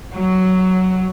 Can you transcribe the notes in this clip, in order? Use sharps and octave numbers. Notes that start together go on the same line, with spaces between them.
F#3